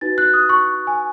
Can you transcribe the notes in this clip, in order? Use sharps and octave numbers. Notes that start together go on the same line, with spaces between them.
D#4 F#4 B4 A6
F#6
D#6
C#6
G#5